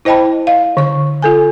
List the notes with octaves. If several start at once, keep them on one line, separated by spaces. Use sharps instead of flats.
E4 C5 D#5 G5 A5 B5
D#5 F5
D3 C#6
F4 A4 G#5